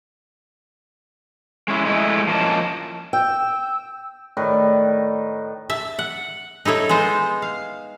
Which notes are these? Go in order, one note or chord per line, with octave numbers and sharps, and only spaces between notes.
G#3 C#4 E4
G#3 A3 E4
F3 A#3 C#4 D#5 A5
G5 E6
A2 D#3 B4 D5
E5 A5
F#5
D#4 E4 A4 C#5
G#3 B3 D#4 C5 G#5
F5